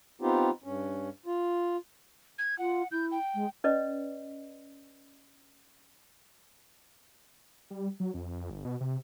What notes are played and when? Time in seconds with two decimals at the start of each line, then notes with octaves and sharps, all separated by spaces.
0.21 B3 C4 D#4 F4 G4
0.64 G2 C#4
1.26 F4
2.39 G#6
2.59 F4 F#5
2.92 E4 G6
3.12 G5
3.34 G#3
3.64 C#4 B4 D5 D#5
7.70 G3
8.00 F#3
8.14 F2
8.50 G1
8.65 B2
8.80 C3